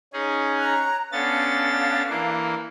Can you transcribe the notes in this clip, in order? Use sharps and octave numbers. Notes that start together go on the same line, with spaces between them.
C#4 D#4 G#4
C#5 A#5 F#6
B3 C#4 D4 A4 F5 A6
E3 A#3